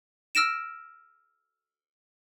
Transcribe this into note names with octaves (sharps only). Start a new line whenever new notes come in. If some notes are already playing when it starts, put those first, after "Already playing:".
E6 F6 A#6 D7 E7